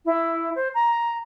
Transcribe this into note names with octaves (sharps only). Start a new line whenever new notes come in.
E4
C5
A#5